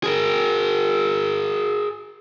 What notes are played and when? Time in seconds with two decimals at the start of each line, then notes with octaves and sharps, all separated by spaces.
0.03 G#4 A#4